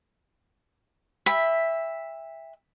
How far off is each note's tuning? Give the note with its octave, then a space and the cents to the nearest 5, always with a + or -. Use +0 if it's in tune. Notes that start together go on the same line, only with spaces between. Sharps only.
E5 +0 G5 +40 B5 +0